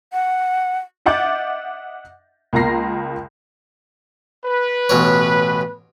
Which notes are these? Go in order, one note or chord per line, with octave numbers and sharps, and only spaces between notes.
F#5
D#5 E5 F#5 D6 G6 A6
C#2 A#3 F4 A#5 A#6 C7
B4
A1 B2 C#5